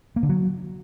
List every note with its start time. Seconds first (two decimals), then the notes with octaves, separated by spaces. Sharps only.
0.16 A#3
0.23 D3
0.29 F#3